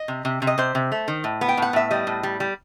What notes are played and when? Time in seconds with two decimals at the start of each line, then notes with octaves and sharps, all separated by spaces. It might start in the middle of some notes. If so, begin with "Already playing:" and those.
Already playing: D#5
0.08 C3
0.25 C3
0.42 C3
0.47 D#5
0.58 C3 C5
0.75 C3
0.92 A3
1.08 D#3
1.24 A2
1.41 B3
1.49 G5
1.57 A2 F#5
1.73 A2 E5
1.91 G3 D#5
2.07 A2
2.23 G3
2.40 G3